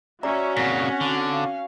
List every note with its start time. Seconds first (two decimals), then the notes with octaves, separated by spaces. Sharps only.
0.23 C#4 F#4 D5 E5 A#5
0.57 A#2 C#3 C4 F#5 A#6 B6
1.01 D3
1.31 F5